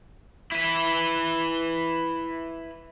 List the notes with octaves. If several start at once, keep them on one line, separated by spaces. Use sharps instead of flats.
E4 B4